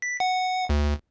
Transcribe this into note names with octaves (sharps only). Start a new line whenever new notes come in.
B6
F#5
D2